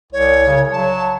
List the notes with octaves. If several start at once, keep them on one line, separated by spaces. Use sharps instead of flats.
C2 C#5
C#3
F#3 A5